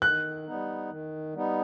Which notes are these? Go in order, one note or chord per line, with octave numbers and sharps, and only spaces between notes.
D#3 F#6
G3 B3 D#4
D#3
G3 B3 D#4